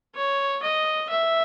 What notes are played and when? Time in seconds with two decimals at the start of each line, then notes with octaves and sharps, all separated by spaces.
0.15 C#5
0.63 D#5
1.10 E5